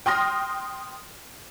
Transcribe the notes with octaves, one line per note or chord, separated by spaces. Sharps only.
G5 C6 D#6 F6 A#6